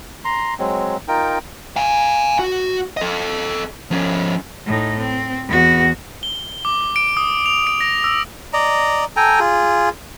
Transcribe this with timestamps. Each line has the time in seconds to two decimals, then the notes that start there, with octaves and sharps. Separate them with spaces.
0.25 A#5 C6
0.59 F#3 G#3 C4
1.08 D#4 F4 A#4 G5
1.76 F5 G#5
2.39 F#4
2.97 A4 D#5
3.91 F3 C#4
4.66 A2 D#4
4.98 C4
5.47 E2 F#4
6.23 G7
6.65 D6
6.96 D7
7.17 D#6
7.46 F7
7.67 D7
7.81 A#6
8.04 E6
8.53 D5 D#5 A#5
9.16 A4 G5 G#5 A#5
9.40 F4 G#4